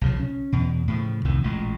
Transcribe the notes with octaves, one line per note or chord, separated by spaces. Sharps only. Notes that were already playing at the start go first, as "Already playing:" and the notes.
B1 C#3 F3
C#4
E2 B2
A2 C#3 F3
C2 F2 A2 D#3
A1 A#2 G#3